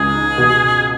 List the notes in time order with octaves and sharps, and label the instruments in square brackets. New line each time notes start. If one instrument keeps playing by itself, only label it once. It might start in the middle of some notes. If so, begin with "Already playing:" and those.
Already playing: [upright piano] C#2 [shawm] G#4
[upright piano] D#4
B2